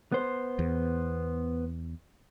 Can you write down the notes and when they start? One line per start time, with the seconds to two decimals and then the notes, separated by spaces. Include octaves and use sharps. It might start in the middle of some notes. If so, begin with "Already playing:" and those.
0.12 B3 C5
0.59 E2